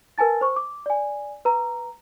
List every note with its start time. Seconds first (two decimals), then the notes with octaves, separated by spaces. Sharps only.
0.18 A#4 B4 G#5 A5 A6
0.41 C5 C#6
0.56 D6
0.86 D5 G#5
1.45 B4 A#5